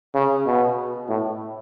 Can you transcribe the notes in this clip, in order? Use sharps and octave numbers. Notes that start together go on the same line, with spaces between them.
C#3
B2
A2